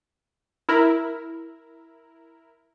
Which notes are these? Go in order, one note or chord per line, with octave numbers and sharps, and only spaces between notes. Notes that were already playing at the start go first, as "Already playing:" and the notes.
E4 A#4